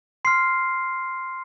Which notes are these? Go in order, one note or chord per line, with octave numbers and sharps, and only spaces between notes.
C6 F6 C7